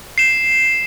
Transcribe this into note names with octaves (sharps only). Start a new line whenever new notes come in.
C7 E7